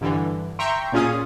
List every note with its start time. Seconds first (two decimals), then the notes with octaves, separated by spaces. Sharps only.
0.01 G2 D3 E3
0.59 E5 G5 A#5 C6 C#6
0.92 A#2 C#4 F4 G#4 D#6